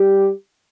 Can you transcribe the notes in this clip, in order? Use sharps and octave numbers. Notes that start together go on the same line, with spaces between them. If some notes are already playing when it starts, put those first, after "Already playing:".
Already playing: G3 G4